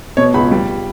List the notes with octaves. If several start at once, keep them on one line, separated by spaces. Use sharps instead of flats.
B2 C#5
C#2 B5
G3